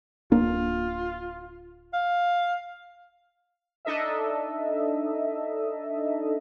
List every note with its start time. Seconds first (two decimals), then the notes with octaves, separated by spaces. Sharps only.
0.32 D1 A#3 D4 F4
1.93 F5
3.85 D4 D#4 A4 D#5 E5